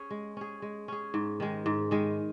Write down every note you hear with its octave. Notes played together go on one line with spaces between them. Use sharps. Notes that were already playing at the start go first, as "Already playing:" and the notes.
Already playing: C#4 G#4
G#3
C#4 G#4
G#3
C#4 G#4
G#2
D#3 G#3
G#2
D#3 G#3